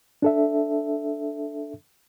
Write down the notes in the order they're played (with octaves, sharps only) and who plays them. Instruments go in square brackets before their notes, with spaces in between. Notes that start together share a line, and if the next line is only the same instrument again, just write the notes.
[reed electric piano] D4 A4 E5